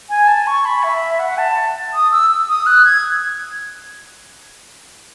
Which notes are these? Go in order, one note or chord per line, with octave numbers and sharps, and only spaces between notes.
G#5
A5
C#6
B5
E5
F#5
A5
D#6
E6
E6
D#6
F#6
G#6